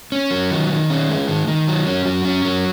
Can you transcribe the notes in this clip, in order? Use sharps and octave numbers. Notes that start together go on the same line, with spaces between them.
C#4
F#3
D#3
D#3
C#4
G#3
D#3
D#3
F#3
C#4
F#3
C#4
F#3